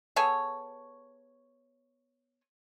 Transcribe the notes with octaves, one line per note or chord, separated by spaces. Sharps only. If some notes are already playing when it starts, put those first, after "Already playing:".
B3 G#4 A4 C#5